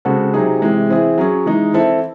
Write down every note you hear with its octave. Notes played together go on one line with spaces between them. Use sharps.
C#3 G#3 C4 F#4 A4
C3 F#3 C4 D#4 G#4
C3 E3 G#3
E3 C4 E4 G#4
F#3 C#4 G#4
E3 G#3 D#4
E3 C4 E4 A4